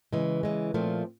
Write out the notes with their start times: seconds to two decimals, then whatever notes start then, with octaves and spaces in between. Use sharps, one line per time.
0.13 C#3 E3 G#3
0.43 C#3 E3 G#3
0.74 A#2 F3 A3 C4